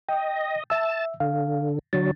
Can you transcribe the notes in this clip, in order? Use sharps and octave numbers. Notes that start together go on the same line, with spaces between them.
D#5 G5
E5 A5 E6
D3 F5
D3 F#3 D4 A6